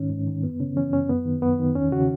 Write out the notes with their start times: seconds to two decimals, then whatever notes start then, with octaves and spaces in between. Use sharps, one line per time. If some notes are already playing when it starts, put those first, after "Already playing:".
Already playing: G#2 D#3 C#4
0.10 G#2
0.27 D#3
0.43 F#2 B3
0.60 C#3 C#4
0.76 E3 C#4
0.93 F#2 C#4
1.09 F#2 B3
1.25 D#3
1.42 F#2 B3
1.59 D#3
1.75 E2 C#4
1.92 C#3 F#4